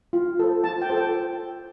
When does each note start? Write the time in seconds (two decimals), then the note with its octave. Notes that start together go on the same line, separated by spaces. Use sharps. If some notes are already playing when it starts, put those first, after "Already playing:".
0.13 F4
0.39 A4 C5
0.64 F4 A5
0.82 G5
0.90 A4 C5
0.98 G5